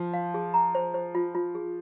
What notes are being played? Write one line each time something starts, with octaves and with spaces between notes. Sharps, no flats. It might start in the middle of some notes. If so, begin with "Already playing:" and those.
Already playing: F3
F5
G#4
A#5
C5
C5
F4
F4
G#4